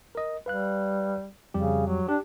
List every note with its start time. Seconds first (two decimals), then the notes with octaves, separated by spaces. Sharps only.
0.15 A#4 D#5
0.46 G3 B4 F5 F#6
1.54 F2 C#3 G3 G4
1.86 F#3
2.09 D4 G4